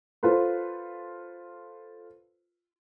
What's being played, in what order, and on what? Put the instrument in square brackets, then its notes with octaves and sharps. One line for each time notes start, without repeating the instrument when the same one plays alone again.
[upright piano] F4 A4 B4 C5